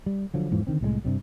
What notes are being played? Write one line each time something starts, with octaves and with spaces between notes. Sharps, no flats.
G3
D3 F3 F#3
E2 G#2 E3 F3
D3 D#3 C4
C2 A2 G3 G#3
G2 C3 G3